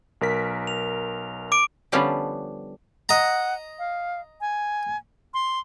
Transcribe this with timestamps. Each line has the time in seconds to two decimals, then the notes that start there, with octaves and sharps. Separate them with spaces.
0.21 B1 A#4 B6
0.67 F7
1.52 D6 D7
1.92 D3 F3 G3 B3 C#4 D4
3.09 D#5 F#5 A#5
3.79 F5
4.41 G#5
5.34 C6